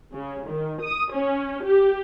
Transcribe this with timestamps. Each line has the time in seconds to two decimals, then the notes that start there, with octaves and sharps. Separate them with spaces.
0.14 C#3
0.49 D#3
0.83 D#6
1.13 C#4
1.65 G4